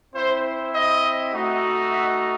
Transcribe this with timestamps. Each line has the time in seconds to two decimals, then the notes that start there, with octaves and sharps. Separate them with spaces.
0.15 C4 E4 C5
0.73 D#5
1.33 A3 D#4 F#4
1.90 E5